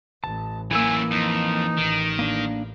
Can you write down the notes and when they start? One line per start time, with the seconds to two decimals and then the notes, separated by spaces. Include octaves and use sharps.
0.24 A1 A5
0.71 F#2 E3 A3 A#3 G#5 E6
1.11 F2 D#4
1.78 A1 D#3
2.19 A#3 D4